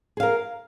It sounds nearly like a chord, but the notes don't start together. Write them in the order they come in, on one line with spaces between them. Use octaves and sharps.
G#4 F5 A#4